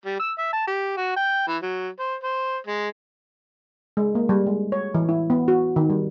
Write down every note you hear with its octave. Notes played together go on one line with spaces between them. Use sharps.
G3
E6
E5
A5
G4
F#4
G5
E3
F#3
C5
C5
G#3
G#3
A#3
G3
G#3
C#5
E3
E4
B3
F#4
D#3
G3